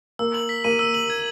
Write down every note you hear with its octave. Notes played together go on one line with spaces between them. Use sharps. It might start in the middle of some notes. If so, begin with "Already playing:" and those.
A#3 E6
F#7
B6
A#3 D#7
E6
F#7
G#6